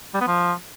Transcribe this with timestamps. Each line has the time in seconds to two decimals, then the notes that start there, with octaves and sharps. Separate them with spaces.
0.14 G3
0.21 B3
0.27 F3